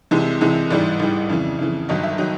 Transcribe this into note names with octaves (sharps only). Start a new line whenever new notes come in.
C2 C3 E3 G#3
C2 C3 E3 G#3
A1 G#2 E3 G3 D5
A1 G#2 E3 G3
F2 C#3 E3
F2 C#3 E3
G1 G2 D#3 F#3 D#5
E5
D#3 F#3 D#5